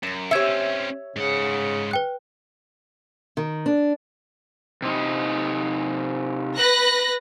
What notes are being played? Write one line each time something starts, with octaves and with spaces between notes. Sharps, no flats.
F#2 A#6 E7
C4 C#4 G4 C#5 E5 G#6 C#7
G#2 C#3 F#5
B4 G5 F#6
D#3
D4
C3 D#4
B4 F#6 A#6